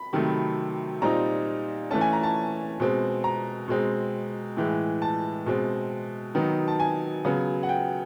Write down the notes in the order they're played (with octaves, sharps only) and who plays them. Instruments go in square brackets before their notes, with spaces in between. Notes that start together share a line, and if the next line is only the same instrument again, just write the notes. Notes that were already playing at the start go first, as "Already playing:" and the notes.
Already playing: [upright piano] B5
C3 D#3 F#3 A3
A#2 G3 C4 D#4 A#5
E3 A3 C#4 A5
G#5
A#5
A5
B2 G#3 C4
A#5
B2 G#3 C4
A2 E3 G#3
A5
B2 G#3 C4
D#3 F#3 B3 D#4
A5
G#5
C#3 F#3 B3
F#5
G5